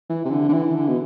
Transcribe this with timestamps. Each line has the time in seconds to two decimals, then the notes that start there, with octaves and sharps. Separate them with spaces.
0.09 E3
0.25 C3
0.31 D3
0.49 D3
0.53 E3
0.75 D3
0.88 B2